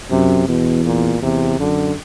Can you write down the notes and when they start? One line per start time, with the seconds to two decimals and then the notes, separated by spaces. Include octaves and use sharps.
0.11 F#2 C3
0.48 E2 B2
0.85 A#2
1.22 E2 C3
1.60 F#2 D3